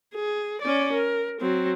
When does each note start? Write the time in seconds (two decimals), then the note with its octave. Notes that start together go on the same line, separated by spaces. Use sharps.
0.15 G#4
0.62 C#4 D5
0.93 A#4
1.41 F#3 C4